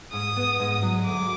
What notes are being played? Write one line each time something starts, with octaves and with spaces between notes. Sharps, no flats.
G#2 D#6
B3
G#2
F#3
D2 D6